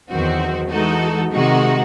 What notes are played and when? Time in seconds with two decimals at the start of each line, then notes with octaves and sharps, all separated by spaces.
0.10 E2 D#3 F#3 C4 F#4
0.70 E3 G#3 D#4 F#4 A4
1.32 C3 D#3 G#3 D#4 F#4